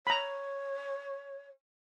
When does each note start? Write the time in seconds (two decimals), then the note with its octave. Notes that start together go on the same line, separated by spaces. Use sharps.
0.07 C#5 A#5 B5